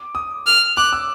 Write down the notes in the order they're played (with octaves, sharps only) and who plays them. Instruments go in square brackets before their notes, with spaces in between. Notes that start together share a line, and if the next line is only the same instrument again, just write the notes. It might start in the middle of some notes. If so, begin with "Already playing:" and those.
Already playing: [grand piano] D6
D#6
[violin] F6
[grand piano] D6 [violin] F#6
[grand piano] E6